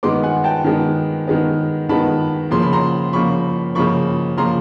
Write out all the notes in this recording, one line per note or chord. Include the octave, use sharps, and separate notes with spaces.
D#3 G#3 B3 C6 D6
F#5 G#5
G5 A5
D#3 G#3 B3
D#3 G#3 B3
D#3 G#3 B3 A5 B5
C#3 F3 A#3 C6
B5
A#5 C6
C#3 F3 A#3 B5 C#6
C#3 F3 A#3 B5 C#6
C#3 F3 A#3 A#5 C6